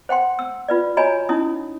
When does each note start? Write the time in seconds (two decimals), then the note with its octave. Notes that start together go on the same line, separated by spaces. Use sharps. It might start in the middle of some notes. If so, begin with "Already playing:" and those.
0.09 C5 F#5 G5 C6
0.39 E6
0.68 F4 B4 D5
0.97 F#4 C#5 D#5 G#5 A#5 B5
1.29 C#4 D#4 E4 D#6